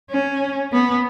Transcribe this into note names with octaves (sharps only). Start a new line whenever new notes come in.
C#4
B3